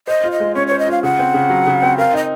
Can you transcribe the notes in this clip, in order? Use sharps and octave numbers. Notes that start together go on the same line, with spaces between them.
C5 D#5
F4
D#5
G#3
C#4 C#5
C5 C#5
D#5
F4 F5
C#3 F#5
C4
C#3
F#3
C#3
C4
A#4 F5
D#4 D#5